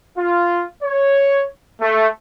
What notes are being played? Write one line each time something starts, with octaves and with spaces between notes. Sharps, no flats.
F4
C#5
A3